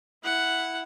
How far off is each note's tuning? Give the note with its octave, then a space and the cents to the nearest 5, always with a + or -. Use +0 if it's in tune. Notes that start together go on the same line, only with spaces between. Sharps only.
E4 +0 F#5 +0